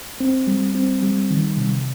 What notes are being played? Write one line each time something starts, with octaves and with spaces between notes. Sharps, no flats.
C4
G3
C4
G3
D#3
C3